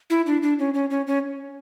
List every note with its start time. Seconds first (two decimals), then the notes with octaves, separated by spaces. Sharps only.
0.10 E4
0.26 D4
0.43 D4
0.59 C#4
0.74 C#4
0.90 C#4
1.07 C#4